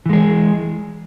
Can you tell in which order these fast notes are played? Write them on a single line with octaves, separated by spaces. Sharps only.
E3 G#3 G#4